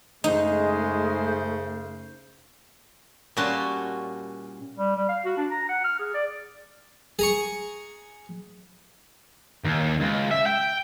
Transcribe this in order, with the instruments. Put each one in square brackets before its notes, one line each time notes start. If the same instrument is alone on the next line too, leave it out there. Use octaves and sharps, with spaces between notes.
[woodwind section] F#2 C#3 C5 [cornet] G#3 [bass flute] A3 [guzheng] D#4
[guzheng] A#2 G3 C#4 F#4 A5 C6
[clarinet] G3
G3
F5
F#4
D4
A#5
F#5
F6
G#4
D5
[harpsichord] G#4 A#5 C#6
[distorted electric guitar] D#2
C#2
E5
G5